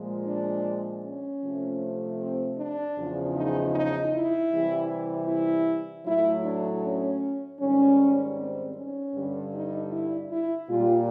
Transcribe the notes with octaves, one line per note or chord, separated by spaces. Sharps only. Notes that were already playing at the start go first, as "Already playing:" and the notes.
Already playing: A#2 F3 G#3
D4
C#4
C3 F3 A3
C4
D4
E2 C#3 F3
D#4
D#4
E4
C3 E3 G3
E4
A2 F#3 A3 E4
D4
C#4
G#2 D#3 G3 C#4
C4
C#4
G2 D3 G3
D#4
E4
E4
A#2 G3 F4